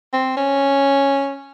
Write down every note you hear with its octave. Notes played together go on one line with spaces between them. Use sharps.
C4
C#4